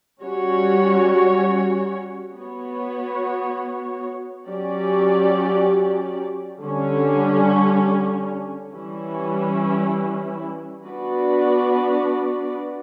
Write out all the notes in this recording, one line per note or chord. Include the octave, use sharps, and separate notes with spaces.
G3 C#4 F#4 C#5
B3 F#4 C#5
F#3 C#4 G4 D5
D3 G3 C#4
E3 G3 C#4 E4
B3 D4 F#4 B4 D5